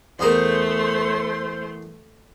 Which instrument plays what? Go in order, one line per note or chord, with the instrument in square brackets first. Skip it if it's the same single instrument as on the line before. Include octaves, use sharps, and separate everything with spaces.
[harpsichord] E2 G#4 A#4 [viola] A3 C6 [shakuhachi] C5